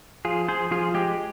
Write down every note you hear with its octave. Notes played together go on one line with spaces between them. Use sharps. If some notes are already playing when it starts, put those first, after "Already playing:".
F3 F4 G#4
F3 G#4 C5
F3 F4 G#4
G#3 G4